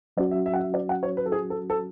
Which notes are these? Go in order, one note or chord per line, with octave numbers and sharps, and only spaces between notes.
F#3 C#4 F#4 D5
E5
E5
F#5
E5
D5
F#5
C#5
B4
A4
G#4
A4
A4